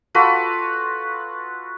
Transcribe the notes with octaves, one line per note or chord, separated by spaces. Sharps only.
F4 F#4 A4 B4